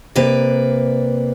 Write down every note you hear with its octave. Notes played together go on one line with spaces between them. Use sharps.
C3 A#3 B4 D5